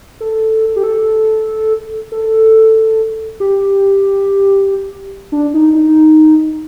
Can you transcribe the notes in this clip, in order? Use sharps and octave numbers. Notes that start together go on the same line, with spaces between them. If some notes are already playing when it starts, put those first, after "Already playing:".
A4
G4
A4
A4
G4
D4
D#4
D#4